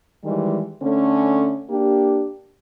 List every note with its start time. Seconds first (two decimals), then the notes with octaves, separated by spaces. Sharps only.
0.24 D#3 E3 G3 G#3
0.82 D3 A3 C#4
1.69 A#3 D4 G4